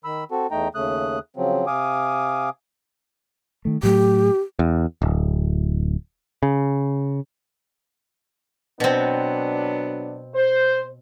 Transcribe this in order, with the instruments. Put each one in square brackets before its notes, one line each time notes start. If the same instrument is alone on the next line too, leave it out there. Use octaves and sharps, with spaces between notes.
[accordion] D#3 B5 E6
C4 F#4 A4
E2 A3 D#4 G5 A#5
D#2 C#3 A3 D#6 F#6
C#3 F3 F#3 C4
C3 F5 G#5 D6 D#6
[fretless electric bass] D#3 A3
[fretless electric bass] A2 F#3 A3 [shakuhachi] G4
[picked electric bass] E2
D1
C#3
[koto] B2 C4 [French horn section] F#3 B3 D4
[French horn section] C5